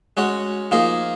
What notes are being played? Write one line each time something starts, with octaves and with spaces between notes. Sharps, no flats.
G#3 C#4 F#4 C#5
F3 A#3 D#4 G#4